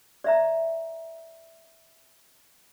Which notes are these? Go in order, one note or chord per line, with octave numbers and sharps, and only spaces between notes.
D5 E5 A#5